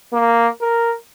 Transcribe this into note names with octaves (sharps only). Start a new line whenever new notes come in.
A#3
A#4